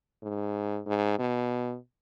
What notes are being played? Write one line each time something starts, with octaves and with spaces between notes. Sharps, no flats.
G#2
G#2
B2